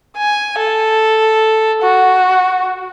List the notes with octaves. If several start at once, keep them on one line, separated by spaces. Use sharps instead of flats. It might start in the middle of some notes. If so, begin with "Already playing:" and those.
G#5
A4
F#4